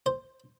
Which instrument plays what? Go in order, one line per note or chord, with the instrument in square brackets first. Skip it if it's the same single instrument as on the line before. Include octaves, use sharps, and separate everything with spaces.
[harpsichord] C5